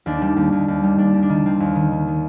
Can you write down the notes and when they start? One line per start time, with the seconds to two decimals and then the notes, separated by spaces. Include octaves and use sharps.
0.06 D#2 D4
0.22 G3
0.37 D#2
0.52 D#2
0.68 D#2
0.83 G3
0.98 D#2 D4
1.14 D#2
1.22 D4
1.29 D#3
1.46 D#3 C4
1.60 D#2
1.76 D#3
1.92 D#3
2.08 D#3